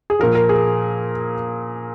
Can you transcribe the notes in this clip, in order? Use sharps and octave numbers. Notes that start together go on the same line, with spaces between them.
G#4
A#2 F3 A#4
A#4
G#4